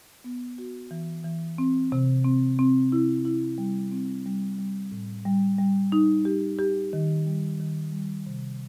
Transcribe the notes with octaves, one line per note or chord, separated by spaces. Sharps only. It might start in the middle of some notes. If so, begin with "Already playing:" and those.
B3
F#4
E3
E3
C4
C3
C4
C4
E4
E4
G3
C4
G3
G3
A2
G3
G3
D#4
G4
G4
D#3
G3
D#3
G3
C3